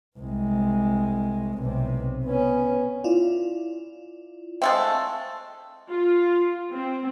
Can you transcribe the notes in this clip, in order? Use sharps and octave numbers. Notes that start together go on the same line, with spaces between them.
C2 G#3
B1 C3
B3 C#4
E4 F4 D5
G#3 A3 C4 E5 F5 C6
F4
C4